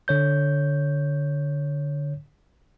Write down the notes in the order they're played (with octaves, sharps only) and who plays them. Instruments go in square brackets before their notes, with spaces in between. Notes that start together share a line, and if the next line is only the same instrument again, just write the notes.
[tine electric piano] D3 C#5 G6